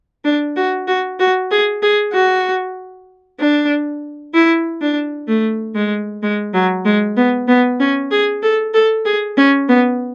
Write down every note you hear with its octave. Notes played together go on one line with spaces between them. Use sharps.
D4
F#4
F#4
F#4
G#4
G#4
F#4
D4
E4
D4
A3
G#3
G#3
F#3
G#3
B3
B3
C#4
G#4
A4
A4
G#4
C#4
B3